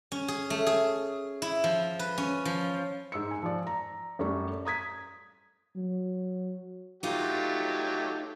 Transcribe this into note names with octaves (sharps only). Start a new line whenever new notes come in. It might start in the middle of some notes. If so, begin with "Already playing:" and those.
C#4
G#4
A3
G#4
E4
F3
B4
C#4
F3
G#2 E6 C#7
G#5
F3 D5
A#5
F#2 G3 A3 C#6
A#5 D#6 G#6 B6
F#3
F#3 A3 D#4 F4 G4